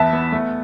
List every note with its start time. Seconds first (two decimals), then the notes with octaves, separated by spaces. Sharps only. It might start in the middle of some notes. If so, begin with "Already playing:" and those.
Already playing: E2 B3 E5 A5
0.13 B3
0.32 A3